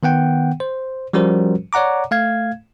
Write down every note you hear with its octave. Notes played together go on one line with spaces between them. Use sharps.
D#3 B3 F#5 G5
C5
F3 G3 C#4 F#4 A#4 C5
C#5 D5 F#5 A#5 D6
A3 F5 G#6